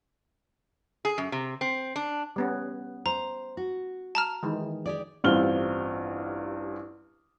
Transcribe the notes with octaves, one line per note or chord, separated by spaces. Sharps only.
G#4
F#2
C3
C4
D4
G3 B3 C#4
C5 A#5
F#4
A5 A#5 F6
D#3 E3 G#3
G4 G#4 D5
A1 G2 C4 F4 F6 G7